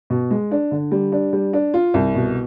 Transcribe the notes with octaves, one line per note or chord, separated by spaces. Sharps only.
B2
G#3
D4
D3
G3
D4
G3
D4
F4
C2
B2